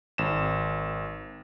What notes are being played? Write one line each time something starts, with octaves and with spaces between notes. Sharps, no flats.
G#1 E7